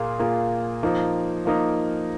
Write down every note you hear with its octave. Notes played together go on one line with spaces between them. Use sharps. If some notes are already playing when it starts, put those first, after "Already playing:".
Already playing: A#2 A#3 F4 G#4
A#2 A#3 F4 G#4
F3 A#3 D#4
F3 A#3 D#4